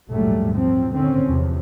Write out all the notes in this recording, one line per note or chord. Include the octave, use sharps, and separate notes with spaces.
A#1 D#2 G#2 F#3 G3 A3
F3 F#3 C4
D3 D#3 C4 C#4
E2 C3 F3